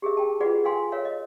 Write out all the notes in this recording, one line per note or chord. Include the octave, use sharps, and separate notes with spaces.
G4 G#4 A#4 E5
G5 A5
F4 F#4 G#4 B4 D5 F#5
A4 F5 G5 G#5 C6
A#4 C#5 E5 F5
D#5